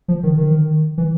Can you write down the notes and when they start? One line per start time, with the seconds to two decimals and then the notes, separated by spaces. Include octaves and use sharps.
0.08 F3
0.23 D#3
0.38 D#3
0.98 E3